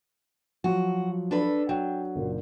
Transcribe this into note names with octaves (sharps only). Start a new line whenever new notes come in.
F3 F#3 F#4
D4 A4 B4
F#3 G5
F#1 A#2